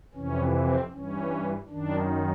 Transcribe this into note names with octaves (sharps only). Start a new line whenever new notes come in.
F2 C3 E3 C#4
C4
G2 E3 C#4
F#2 D#3 D4